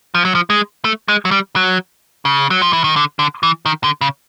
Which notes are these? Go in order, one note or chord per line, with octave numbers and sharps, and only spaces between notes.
F3
F#3
F3
G#3
A3
G#3
F#3
G3
F#3
C#3
F#3
F3
E3
D#3
D3
D3
E3
D#3
D3
C#3